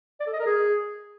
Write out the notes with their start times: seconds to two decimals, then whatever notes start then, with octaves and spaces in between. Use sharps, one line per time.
0.20 D5
0.26 A4
0.33 D#5
0.39 A#4
0.46 G#4